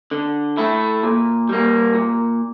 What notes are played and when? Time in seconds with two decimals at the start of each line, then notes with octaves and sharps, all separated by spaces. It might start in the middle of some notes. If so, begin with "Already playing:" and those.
0.11 D3
0.57 A3 E4
1.03 A#2
1.49 G3 A#3
1.95 A#2